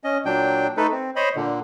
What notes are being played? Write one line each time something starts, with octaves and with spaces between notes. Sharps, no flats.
C#4 D#5
A#2 F#3 D4 G5
A3 D#4 A4 B4
C4
C5 C#5 D#5 B5
A#2 D3